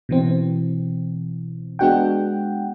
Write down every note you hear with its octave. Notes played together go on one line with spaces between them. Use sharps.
B2 E3 C4
G#3 B3 D4 F#4 F#5 G5